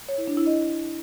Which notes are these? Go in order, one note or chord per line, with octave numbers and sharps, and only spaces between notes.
C#5
E4
D4
E4
D#5